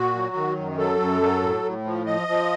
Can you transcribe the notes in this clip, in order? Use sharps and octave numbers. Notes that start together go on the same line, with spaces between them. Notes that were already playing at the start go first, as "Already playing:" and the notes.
Already playing: A#2 F#4
F#3
D#3
F#2
F#3 A4
F#2
F#3
A2
A2
F3
F3 D#5
F3